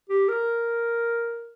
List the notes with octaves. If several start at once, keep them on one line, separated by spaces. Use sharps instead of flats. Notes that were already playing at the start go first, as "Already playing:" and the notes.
G4
A#4